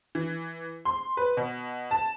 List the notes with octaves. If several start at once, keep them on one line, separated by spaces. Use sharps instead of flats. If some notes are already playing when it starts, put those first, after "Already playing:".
E3
C6
B4
B2
A5